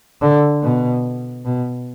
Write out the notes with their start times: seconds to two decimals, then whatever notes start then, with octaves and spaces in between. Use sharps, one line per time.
0.21 D3
0.63 B2
1.45 B2